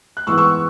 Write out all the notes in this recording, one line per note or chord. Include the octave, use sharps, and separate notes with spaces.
F#6
G#2 E3 B3 C#6 E6
C#6 E6